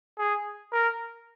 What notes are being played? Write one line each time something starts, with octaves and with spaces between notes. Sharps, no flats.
G#4
A#4